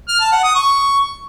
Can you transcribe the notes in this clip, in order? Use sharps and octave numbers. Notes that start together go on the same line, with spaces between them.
F6
A5
F#5
D#6
C#6